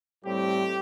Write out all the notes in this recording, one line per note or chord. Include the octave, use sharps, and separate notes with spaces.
A2 G3 C4 G4